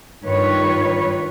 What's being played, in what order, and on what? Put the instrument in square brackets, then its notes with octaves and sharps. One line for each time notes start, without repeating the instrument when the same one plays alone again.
[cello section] G2 D#3 F4 B4 C#5